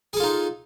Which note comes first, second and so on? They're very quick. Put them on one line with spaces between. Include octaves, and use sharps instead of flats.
G#4 A4 F4 D#4